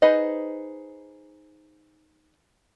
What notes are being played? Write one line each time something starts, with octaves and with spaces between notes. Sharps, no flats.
D#4 G#4 B4 C5 D#5